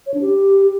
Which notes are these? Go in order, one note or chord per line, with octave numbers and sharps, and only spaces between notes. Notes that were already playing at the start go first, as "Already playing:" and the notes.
C#5
D4
G4